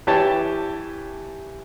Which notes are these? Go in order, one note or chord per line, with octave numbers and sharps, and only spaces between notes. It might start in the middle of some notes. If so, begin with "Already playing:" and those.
E3 G4 C#5 A5